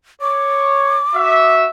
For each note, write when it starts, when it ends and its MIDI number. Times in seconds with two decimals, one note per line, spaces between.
0.21 1.01 73
0.21 1.54 86
1.15 1.67 66
1.15 1.67 76